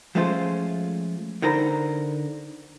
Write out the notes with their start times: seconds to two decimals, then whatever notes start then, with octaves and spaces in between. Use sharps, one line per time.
0.15 F3 G#3 A3 C#4 F4 C5
1.42 D3 D#4 A#4 C5 A#5 B5